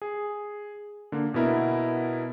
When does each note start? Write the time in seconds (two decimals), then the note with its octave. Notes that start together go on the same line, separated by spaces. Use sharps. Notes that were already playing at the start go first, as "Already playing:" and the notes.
0.02 G#4
1.12 D3 A#3
1.34 B2 B3 E4 A#4